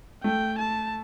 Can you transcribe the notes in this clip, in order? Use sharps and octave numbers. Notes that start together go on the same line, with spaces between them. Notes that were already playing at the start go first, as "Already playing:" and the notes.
A3 G5
A5